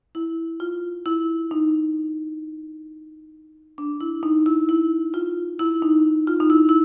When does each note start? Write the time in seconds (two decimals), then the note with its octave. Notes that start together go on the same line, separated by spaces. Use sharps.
0.15 E4
0.60 F4
1.06 E4
1.51 D#4
3.78 D4
4.01 E4
4.23 D#4
4.46 E4
4.69 E4
5.14 F4
5.59 E4
5.82 D#4
6.27 F4
6.40 D#4
6.50 E4
6.69 E4